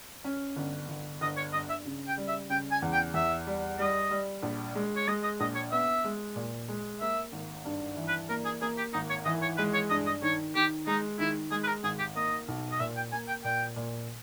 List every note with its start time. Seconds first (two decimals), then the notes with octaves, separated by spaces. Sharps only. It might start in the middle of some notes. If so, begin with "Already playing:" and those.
0.24 C#4
0.56 G1
0.89 G1
1.21 G1 D#5
1.37 C#5
1.53 G2 D#5
1.69 E5
1.85 C#3
2.08 G5
2.17 G3
2.28 E5
2.50 C#3 G5
2.71 G#5
2.82 E2
2.93 G5
3.14 E2 E5
3.47 G3
3.79 G3 D#5
4.11 G3
4.43 A#1
4.75 G#3
4.96 C#5
5.08 G#3 D#5
5.23 D#5
5.40 A#1 D#5
5.55 C#5
5.71 B3 E5
6.05 G#3
6.36 A#2
6.68 G#3
7.00 A#3 E5
7.32 G#1
7.65 G2
7.97 E3
8.08 B4
8.29 A#3 A#4
8.45 G#4
8.62 A#3 G#4
8.78 G4
8.93 G#1 D#4
9.10 C#5
9.25 E3 D#5
9.42 C#5
9.57 G#3 B4
9.74 C#5
9.90 G2 D#5
10.07 D#5
10.22 D#3 C#5
10.55 D#3 G4
10.87 G#3 D#4
11.19 D#3 E4
11.51 G#3 G#4
11.63 B4
11.67 A#4
11.83 G#1 G#4
11.99 G4
12.15 A#3 D#5
12.48 B1
12.72 D#5
12.80 A#2 E5
12.96 G5
13.12 A#3 G#5
13.28 G5
13.44 A#2 G5
13.76 A#2